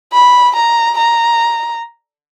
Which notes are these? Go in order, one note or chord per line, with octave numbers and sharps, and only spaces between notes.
B5
A#5
A#5